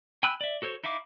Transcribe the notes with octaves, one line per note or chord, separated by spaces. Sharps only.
G5 G#5 B5 E6 F#6
D5 E5
F#4 A4 C5 C#5
D#4 E4 E5 F5 D6